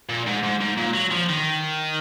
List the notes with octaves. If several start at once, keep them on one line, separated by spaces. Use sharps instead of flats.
A#2
G#2
G#2
G#2
A#2
F#3
F3
D#3